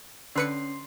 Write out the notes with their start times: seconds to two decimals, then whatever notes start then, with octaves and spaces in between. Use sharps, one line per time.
0.35 D3 C#4 B4 C6 C7 C#7